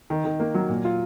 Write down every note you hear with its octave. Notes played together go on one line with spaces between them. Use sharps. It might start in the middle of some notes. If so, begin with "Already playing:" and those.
D#3
D#3
A#3
F#3
A#2
F4